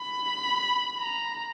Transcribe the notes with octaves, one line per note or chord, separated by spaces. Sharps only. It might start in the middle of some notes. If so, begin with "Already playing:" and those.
Already playing: B5
A#5